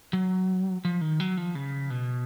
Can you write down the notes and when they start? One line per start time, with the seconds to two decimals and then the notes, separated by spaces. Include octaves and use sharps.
0.13 F#3
0.85 F3
1.01 D#3
1.20 F#3
1.37 F3
1.55 C#3
1.90 B2